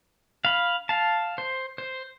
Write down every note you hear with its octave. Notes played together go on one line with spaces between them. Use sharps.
F5 B5
F5 A5
C5
C5